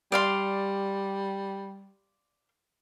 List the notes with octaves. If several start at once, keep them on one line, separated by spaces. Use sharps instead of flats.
G3 D5 F5 C6